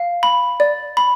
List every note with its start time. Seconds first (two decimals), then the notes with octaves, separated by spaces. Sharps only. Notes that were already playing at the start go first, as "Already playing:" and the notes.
Already playing: F5
0.23 B5
0.60 D5
0.97 B5